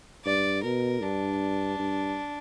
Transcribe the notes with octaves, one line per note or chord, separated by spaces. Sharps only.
G2 D5
B2 A#4
G2 D4
G2